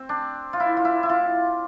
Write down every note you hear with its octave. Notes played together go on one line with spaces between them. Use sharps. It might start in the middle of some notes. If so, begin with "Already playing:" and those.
Already playing: C4
D4
F4
E4
F4
E4
E4
F4